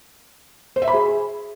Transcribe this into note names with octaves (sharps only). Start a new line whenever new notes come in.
C5
E5
B5
G#4